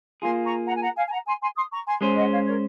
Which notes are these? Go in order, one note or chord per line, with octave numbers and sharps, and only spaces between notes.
A#3 F4 G#4 G#5 C6
A#5 C#6
F#5 A#5
G#5
F#5 A#5
F5 G#5
G#5
F#5 A#5
G#5 C6
G#5 C6
C6 D#6
A#5 C#6
G#5 C6
G#3 C#4 G#4 C5
D#5 F#5
C#5 F5
A#4 C#5